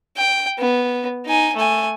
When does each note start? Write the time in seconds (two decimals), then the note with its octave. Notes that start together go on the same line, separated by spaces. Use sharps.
0.17 G5
0.59 B3
1.26 D#4 G#5
1.57 A3 G#5